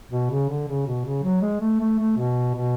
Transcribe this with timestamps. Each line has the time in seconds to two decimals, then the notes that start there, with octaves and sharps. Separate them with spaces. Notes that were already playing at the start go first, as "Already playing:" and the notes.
0.11 B2
0.31 C#3
0.49 D3
0.68 C#3
0.87 B2
1.06 C#3
1.23 F#3
1.42 G#3
1.61 A3
1.80 A3
1.99 A3
2.17 B2
2.55 B2